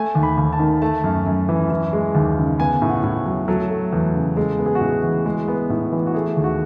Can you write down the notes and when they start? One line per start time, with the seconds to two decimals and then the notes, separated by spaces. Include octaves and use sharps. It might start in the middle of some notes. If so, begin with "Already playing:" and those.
Already playing: A3 G#5
0.15 D#2
0.23 B5
0.38 D#2
0.53 A5
0.60 D#3
0.82 A3 A5
1.04 F#2
1.26 F#2
1.49 E3
1.70 E3
1.93 G#3
2.15 D#2
2.37 C#3
2.60 B3 G#5
2.82 A2
2.89 F#5
3.03 A2
3.26 F#3
3.48 F#3 A4
3.70 A3
3.93 E2
4.15 C#3
4.37 G#3 A4
4.59 B3
4.66 G#4
4.75 F#4
4.81 A2 G#4
5.03 E3
5.26 G#3
5.48 B3
5.70 A2
5.92 E3
6.07 F#4
6.14 A3 G#4
6.36 D#2
6.44 F#4